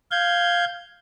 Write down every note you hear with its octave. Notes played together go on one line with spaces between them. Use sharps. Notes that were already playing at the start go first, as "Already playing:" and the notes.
F5 G6 G#6